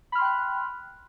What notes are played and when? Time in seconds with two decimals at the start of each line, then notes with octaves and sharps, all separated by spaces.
0.12 B5
0.15 F6
0.18 C6
0.22 G5
0.25 F#6